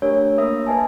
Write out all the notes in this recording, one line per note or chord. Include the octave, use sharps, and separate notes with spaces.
A3 D4 G4 A#4 C#5
A#3 A#4 E5 D#6
D4 B4 D#5 G#5 A5